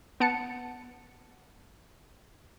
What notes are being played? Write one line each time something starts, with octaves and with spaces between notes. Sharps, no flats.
B3 F#5 A5 C#7